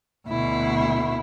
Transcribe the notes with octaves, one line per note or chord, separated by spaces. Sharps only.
D2 B2 E4